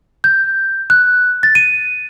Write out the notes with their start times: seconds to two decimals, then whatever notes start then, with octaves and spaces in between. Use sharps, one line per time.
0.24 G6
0.90 F#6
1.43 A6
1.55 D#7